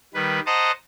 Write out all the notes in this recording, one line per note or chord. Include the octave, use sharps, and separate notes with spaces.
D#3 G3 B4
C5 D#5 F#5 A5 A#5 D#6